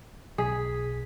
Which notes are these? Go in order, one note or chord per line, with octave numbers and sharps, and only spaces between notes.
B1 G#4 G#5 B6